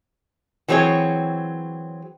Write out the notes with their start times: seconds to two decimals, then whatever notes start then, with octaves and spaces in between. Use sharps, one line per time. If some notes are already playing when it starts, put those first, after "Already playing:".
0.68 E3 F#3 C4 G#4 C#5